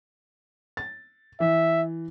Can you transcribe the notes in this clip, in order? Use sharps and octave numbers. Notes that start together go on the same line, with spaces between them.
A6
E3 E5